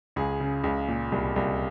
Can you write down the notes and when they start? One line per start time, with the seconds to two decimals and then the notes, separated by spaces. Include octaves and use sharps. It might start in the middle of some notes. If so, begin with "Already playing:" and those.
0.16 C#2 G#4
0.40 C#3
0.64 C#2
0.88 A#2
1.12 C2
1.36 C2